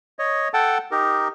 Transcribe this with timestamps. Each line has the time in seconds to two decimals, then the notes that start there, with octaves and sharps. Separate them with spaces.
0.19 C#5 D#5
0.54 A4 F#5 G5 A5
0.91 D#4 G4 A#4